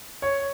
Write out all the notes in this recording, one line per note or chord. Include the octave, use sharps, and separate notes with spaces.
C#5